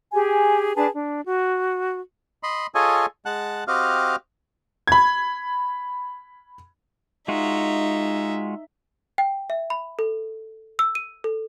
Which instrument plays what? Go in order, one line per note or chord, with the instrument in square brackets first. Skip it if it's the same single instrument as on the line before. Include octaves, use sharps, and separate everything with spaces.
[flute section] G4 G#4 G#5
D4 G#4 B4 A5
D4
F#4
[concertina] D#5 B5 C6
F4 G#4 A4 C#5 D#5 G#5
G#3 F#5 A5 F#6
C4 F#4 G4 D#5 F5 F6
[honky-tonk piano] B5 G#6
[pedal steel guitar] G#3 F4 F#4 [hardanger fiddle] D#4 E5
[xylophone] G5
E5
B5
A4
E6
D#7
A4